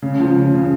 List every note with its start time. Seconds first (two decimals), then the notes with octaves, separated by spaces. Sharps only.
0.02 C#3
0.20 F3
0.37 C#3
0.54 C#3